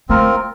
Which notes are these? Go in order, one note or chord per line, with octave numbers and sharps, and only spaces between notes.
A3 C4 F4 A#4